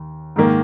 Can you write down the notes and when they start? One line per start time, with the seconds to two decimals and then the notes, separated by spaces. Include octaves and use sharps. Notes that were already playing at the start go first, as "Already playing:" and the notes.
Already playing: D#2
0.36 G#2 D#3 A#3